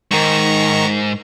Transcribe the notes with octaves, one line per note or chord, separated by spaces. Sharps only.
G#2 D#3 A#5 C#6